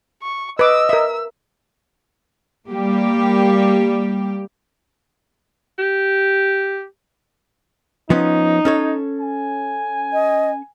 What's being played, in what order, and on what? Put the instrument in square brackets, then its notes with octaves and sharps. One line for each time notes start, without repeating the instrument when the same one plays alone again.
[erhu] C#6
[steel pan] B4 D6 [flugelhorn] D#5 [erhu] E6
[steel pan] A#4 E5
[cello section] G3 A#3 G4
[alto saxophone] G4
[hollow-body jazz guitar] F3 B3 C#4 [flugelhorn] D#4
[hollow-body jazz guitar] C#4 A4 C#5
[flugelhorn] G#5
[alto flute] D#5